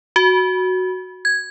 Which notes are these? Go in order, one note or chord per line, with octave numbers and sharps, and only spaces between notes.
F#4
G#6